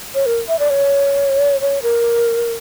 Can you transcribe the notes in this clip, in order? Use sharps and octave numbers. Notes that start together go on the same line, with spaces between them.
C#5
A#4
E5
D5
C#5
C#5
A#4